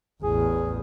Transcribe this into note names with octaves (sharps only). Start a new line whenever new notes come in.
A1 E2 G#4